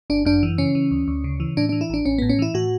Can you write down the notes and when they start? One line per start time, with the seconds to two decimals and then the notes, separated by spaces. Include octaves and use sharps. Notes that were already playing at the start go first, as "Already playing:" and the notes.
0.10 G1 D4
0.25 F#2 D4
0.43 E3
0.58 C#3 C#4
0.75 E3
0.91 D2
1.08 D2
1.24 C#3
1.40 E3
1.57 A2 D4
1.69 E3 D4
1.81 E4
1.90 A1 D4
2.05 A1 C#4
2.18 A2 B3
2.29 C#4
2.39 E3 E4
2.54 A2 F#4